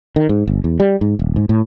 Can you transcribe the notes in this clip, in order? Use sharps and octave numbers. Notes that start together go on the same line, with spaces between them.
D#3
G#2
G1
E2
G3
G#2
D#1
G#2
A2